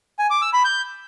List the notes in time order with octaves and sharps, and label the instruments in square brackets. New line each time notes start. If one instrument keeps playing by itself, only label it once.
[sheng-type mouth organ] G#5
D6
E6
B5
G6